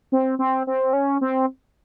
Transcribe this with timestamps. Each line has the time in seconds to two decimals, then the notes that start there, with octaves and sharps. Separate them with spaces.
0.12 C4
0.39 C4
0.67 C4
0.93 C#4
1.21 C4